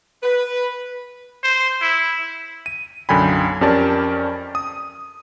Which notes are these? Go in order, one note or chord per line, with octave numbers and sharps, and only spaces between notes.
B4
C5
E4
D#7
B1 F#2 D3 G5 G#5 B5
F2 C#4 G4 A#4 D5 A5
D#6